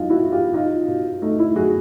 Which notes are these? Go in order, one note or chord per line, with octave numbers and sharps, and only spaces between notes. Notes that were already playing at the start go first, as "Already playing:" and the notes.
Already playing: E2 F#3 D#4 F4
E4 F#4
B2
F4 G4
B2 D#4 F4
B2
A3 D#4
E4
F#3 F#4 G#4